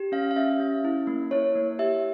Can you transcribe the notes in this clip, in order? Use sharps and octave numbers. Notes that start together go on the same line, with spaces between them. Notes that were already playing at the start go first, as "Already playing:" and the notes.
Already playing: G4
C#4 F5
F5
C#4 E5
C#4
E4
A#3
E4 C#5
A#3
G4 E5